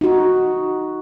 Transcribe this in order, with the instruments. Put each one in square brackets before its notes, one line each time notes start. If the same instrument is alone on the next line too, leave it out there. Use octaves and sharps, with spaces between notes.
[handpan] D#4 F#4